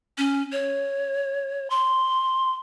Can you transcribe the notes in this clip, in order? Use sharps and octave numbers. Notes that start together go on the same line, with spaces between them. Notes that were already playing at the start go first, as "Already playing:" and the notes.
C#4
C#5
C6